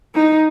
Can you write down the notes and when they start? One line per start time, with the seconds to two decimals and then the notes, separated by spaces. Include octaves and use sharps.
0.15 D#4